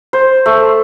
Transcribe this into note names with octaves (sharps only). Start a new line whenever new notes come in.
C5
A3